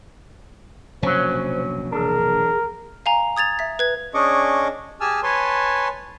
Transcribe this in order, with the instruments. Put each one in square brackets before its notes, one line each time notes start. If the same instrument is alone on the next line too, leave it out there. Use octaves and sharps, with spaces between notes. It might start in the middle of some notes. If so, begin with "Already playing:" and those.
[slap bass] F1 A#1 B2 [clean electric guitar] F#3 C#4 [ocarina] C5
[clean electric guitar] B1 E2 D4 [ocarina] G#4 [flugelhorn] A#4
[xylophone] F5 G#5 A#5
D#6 G#6 A6 F7
E5 B6
B4 G#6
[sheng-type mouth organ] C#4 D4 G#4 D#5 C#6 D6
G4 G#4 G#5 A5 E6 F6
B4 C#5 G#5 A5 C6